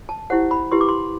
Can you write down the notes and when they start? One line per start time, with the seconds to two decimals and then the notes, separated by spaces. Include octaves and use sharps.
0.09 A5
0.30 E4 G4 C5 F#5
0.51 B5
0.72 E4 G4 B4 C6
0.81 D6
0.89 C6